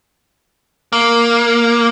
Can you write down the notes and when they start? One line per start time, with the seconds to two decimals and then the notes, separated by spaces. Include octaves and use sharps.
0.93 A#3